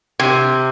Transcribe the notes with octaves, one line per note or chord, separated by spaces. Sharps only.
C3